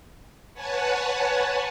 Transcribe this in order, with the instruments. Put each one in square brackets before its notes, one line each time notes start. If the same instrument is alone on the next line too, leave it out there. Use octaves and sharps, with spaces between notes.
[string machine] B4 C#5 F#5 G#5 A5